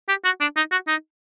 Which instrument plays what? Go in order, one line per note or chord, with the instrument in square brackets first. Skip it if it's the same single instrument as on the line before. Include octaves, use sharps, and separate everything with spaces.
[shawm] G4
F#4
D4
D#4
F#4
D#4